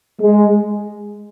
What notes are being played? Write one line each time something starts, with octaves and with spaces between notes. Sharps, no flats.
G#3